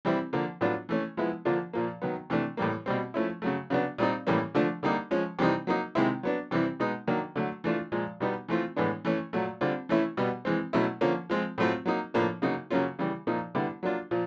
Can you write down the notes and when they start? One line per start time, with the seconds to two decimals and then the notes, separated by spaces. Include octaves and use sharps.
0.05 E3 G3 C4 E4
0.33 D3 F3 A#3
0.61 A2 F#3 B3 D4 F4
0.89 E3 A3 C#4
1.17 F3 G#3 B3 E4
1.45 D3 F3 A#3 D4 F4
1.73 A#2 F3 A#3
2.02 D#3 F#3 B3
2.30 C3 E3 A3 D4
2.57 A2 E3 G3 A#3
2.86 B2 G3 C4
3.14 F3 A3 C#4 E4
3.42 C#3 F#3 A3
3.70 C#3 F#3 B3 D4
3.98 A#2 G3 C4 D#4
4.27 A2 E3 G3 A#3 C#4
4.55 D3 F3 A3 D4
4.83 D3 G3 A#3 D#4
5.11 F3 G#3 C#4
5.39 C3 E3 G3 C4 D#4
5.67 F#3 A#3 D#4
5.95 C3 D#3 G#3 C4 E4
6.23 F#3 B3 D4
6.51 C3 E3 G3 C4 E4
6.80 B2 G#3 B3 D#4
7.07 D#3 F#3 A#3 D4
7.36 D3 F#3 A3
7.64 E3 A3 D4 F4
7.92 A#2 F3 G#3
8.20 B2 G3 B3 D#4
8.49 E3 A3 C4 F4
8.76 A2 E3 G#3 B3 D4
9.05 E3 A3 C#4
9.33 A#2 F#3 A3
9.61 D3 G3 C4 F4
9.89 E3 A3 C#4 E4
10.17 B2 G3 B3
10.45 E3 G#3 C4
10.73 B2 F#3 A3 C#4 E4
11.01 D3 F3 A#3 C#4
11.30 F3 G#3 C4 F4
11.58 A2 F#3 A3 C4 F4
11.86 F#3 A#3 D#4
12.14 A2 F3 A#3 D4
12.42 C#3 F#3 A#3 D#4
12.70 C#3 F#3 A#3 C#4 F4
12.99 C#3 E3 G3
13.27 A#2 F3 A#3 D#4
13.55 D3 G3 B3 E4
13.83 F#3 A#3 D4 F4
14.11 A#2 F3